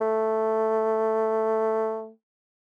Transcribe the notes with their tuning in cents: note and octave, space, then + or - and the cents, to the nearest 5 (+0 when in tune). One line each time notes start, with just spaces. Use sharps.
A3 +5